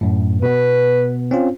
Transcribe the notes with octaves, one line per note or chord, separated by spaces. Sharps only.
F#2 A2
B2 B3 B4
C4 C#4 F4